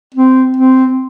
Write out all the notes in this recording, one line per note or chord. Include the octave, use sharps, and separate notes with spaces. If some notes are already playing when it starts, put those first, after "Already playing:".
C4
C4